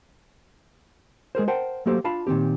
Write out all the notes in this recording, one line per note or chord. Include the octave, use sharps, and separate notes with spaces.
G#3 G#4 A#4 C5
A#4 C5 F#5 G5 A5
F#3 A3 A#3 G4 A4 C5
D4 F4 F5 A5 B5
A#2 D#3 G#3 C4 G4